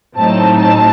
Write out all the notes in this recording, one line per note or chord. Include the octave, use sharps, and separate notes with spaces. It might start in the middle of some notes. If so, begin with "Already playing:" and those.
A2 F#3 A3 C4 D#4 A5
A5